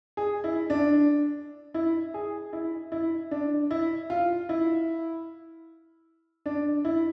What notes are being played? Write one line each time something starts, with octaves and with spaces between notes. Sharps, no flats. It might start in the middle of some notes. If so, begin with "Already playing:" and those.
G#4
E4
D4
E4
G#4
E4
E4
D4
E4
F4
E4
D4
E4